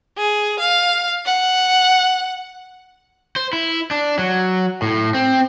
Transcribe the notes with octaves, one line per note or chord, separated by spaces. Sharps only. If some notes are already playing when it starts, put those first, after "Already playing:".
G#4
F5
F#5
C5
E4
D4
F#3
A2
C4